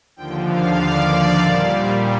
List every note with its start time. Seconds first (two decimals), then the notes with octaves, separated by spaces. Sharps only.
0.16 D#2 D3 F3 G5
0.47 F5
0.79 D5
1.40 A#2 G3 C5